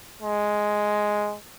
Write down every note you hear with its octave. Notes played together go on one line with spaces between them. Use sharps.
G#3